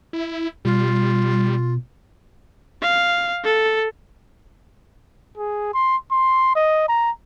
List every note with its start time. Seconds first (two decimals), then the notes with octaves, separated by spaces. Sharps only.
0.13 E4
0.65 B2 G3 F4
2.82 F5
3.44 A4
5.37 G#4
5.74 C6
6.11 C6
6.55 D#5
6.88 A#5